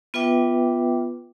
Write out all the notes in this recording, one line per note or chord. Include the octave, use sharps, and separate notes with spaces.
B3 F4 B4 E5 G5 D6